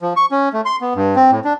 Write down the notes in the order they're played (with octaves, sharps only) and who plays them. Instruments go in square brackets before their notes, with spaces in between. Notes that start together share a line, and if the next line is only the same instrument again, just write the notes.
[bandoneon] F3
C#6
C#4
A3
C6
B3
G2
C4
A2
D4